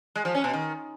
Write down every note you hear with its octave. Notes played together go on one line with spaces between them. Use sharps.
G#3
F3
C#4
B2
D#3